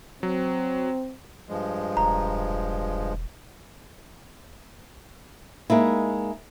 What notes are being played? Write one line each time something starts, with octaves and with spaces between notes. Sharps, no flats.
F#3 C4
G2 F3 G#3
E1 A#5
G#3 A#3 D#4 E4